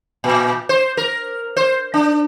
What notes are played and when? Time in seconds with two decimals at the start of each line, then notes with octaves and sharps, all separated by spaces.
0.24 A#2
0.69 C5
0.97 A#4
1.56 C5
1.94 D4